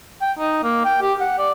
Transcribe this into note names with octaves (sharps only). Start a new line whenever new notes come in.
G5
D#4
A#3
G5
G4
F#5
D5